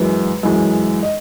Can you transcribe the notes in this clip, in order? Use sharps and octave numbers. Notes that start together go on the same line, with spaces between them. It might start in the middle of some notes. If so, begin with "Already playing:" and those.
Already playing: F#2 E3 G#3 B4
F#2 E3 G#3
D#5